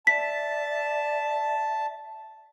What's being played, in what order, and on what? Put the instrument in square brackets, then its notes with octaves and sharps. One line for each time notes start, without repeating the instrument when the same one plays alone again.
[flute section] D5 E5 [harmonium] A5 [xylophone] B6